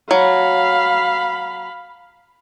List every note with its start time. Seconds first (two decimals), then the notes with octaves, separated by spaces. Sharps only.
0.11 F#3 F5 B5